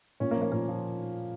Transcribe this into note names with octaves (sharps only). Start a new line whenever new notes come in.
A#2 C#4
A#3
F3
A#3
A#2 A#3
F3